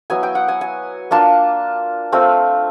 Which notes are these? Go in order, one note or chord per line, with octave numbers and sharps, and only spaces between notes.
F#3 B3 E4 G#5
G5
F#5
G#5
G#5
A#3 D4 F4 A5
A3 C4 F4